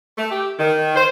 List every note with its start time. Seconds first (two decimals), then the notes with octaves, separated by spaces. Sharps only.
0.17 A3
0.32 G4
0.59 D#3
0.96 C5